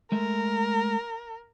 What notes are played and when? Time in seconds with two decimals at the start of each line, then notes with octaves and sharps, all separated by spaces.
0.12 G#3 A3 A#4 E5